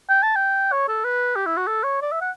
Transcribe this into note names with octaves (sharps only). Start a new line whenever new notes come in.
G5
A5
G5
C#5
A4
B4
G4
E4
F#4
A4
C#5
D5
E5
F#5